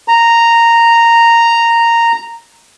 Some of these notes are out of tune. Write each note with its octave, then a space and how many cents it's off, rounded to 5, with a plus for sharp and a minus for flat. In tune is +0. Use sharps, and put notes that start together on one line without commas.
A#5 -10